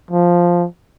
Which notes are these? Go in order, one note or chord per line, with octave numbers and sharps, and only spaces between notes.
F3